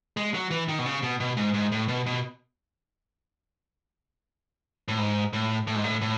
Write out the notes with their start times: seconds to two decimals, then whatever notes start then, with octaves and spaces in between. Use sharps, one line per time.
0.17 G#3
0.34 F#3
0.51 E3
0.68 D#3
0.79 B2
0.86 C#3
1.03 B2
1.20 B2
1.37 G#2
1.54 G#2
1.72 A2
1.88 B2
2.06 B2
4.88 A2
4.99 G#2
5.33 A2
5.67 A2
5.75 G#2
5.84 A2
6.01 A2